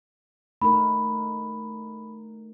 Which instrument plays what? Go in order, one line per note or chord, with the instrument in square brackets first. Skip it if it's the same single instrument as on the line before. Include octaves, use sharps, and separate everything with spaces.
[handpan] A3 D#4 A#4 [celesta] B5